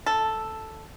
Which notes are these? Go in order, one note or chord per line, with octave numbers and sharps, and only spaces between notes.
A4